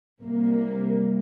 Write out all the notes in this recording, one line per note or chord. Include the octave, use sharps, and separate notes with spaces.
C2 A#3